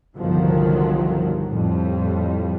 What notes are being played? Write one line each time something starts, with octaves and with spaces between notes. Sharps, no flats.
G1 C2 D#3 F3 F#3
F2 A2 G3